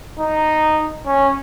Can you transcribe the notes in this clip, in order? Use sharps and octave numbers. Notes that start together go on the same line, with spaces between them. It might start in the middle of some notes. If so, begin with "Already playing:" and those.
D#4
C#4